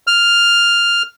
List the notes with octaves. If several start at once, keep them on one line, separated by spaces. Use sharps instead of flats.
F6